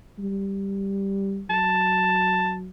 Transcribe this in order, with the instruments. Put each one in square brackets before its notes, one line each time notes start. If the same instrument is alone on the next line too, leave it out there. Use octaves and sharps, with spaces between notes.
[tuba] G3
[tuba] F#3 [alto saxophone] A5